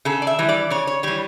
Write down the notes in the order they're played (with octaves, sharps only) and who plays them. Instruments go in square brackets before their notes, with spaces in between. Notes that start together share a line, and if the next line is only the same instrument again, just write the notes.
[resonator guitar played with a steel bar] C#3 A4
D5
E5
E3 G3
D5
C#3 C#5
C#5
E3 G3 C#5